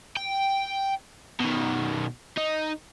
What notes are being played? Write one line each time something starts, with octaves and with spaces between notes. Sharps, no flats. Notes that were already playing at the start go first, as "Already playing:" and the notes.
G5
B2 D#3
D#4